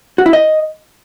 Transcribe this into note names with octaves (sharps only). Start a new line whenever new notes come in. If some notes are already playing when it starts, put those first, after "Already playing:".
F#4
E4
D#5